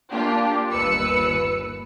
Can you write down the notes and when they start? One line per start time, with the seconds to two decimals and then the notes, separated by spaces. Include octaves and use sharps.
0.11 A#3 D4 F4 G4
0.70 G1 D#2 B4 E6 C#7